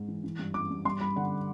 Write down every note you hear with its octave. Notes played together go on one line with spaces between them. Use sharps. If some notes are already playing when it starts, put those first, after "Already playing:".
Already playing: G#2
E3
E3
G2
E3 D6
G2
G2 C6
G3 B5
D3 F#5